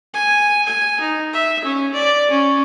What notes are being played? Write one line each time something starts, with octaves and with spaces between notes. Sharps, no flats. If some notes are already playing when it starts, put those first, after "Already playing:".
G#5
G#5
D#4
E5
C#4
D5
C#4